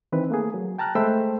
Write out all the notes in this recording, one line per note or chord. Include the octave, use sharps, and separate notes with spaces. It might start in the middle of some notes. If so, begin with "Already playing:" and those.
D#3 E3 C4 B4
A3 A#3 G#4
F#3
G5 A5 A#5 F6 F#6
G#3 A3 C5 G5 B5 E6